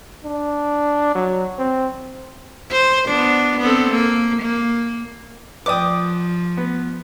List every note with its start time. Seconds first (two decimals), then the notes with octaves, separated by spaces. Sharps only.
0.24 D4
1.15 F#3
1.59 C4
2.72 C5
3.09 B3 D4
3.59 B3 C4 A4
3.90 A#3
4.42 A#3
5.66 F3 B4 D5 G5 D6 D#6
6.57 B3